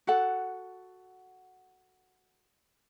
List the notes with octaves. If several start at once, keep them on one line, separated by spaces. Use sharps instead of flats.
F#4 A4 F#5